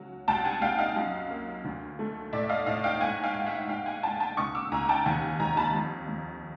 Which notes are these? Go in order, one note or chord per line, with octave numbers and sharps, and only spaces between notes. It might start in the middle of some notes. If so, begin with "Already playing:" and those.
Already playing: C#2 F#3
C2 G5 A5
F#5 G#5
C2 F5 G5
D#5 F5
F#2
A#3
D2
A3
A2 D5 E5
D#5 F5
A2 D#5 F5
F5 G5
G#2 F#5 G#5
F5 G5
G#2
E5 F#5
G#2 F5 G5
F#5 G#5
G#2 G5 A5
G#5
G5 A5
C#2 C#6 D#6
D6 E6
C#2 G#5 A#5
G5 A5
D#2 F#5 G#5
D#2 G#5 A#5
A5 B5
F2
F2